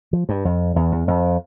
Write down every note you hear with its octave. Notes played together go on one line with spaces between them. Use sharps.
F3
G2
F2
E2
E2
F2